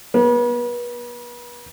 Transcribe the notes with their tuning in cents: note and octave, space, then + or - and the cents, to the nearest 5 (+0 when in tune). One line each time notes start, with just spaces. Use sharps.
B3 -35